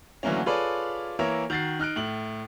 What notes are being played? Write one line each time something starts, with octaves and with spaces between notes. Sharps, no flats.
D3 E3 F#3 A3 A#3 C#4
F4 G#4 A4 B4 C#5 D5
E3 A#3 A#4 C#5 E5
D#3 F#4 A6 C7
D#4 F6 F#6 D7
A2 E4 F#7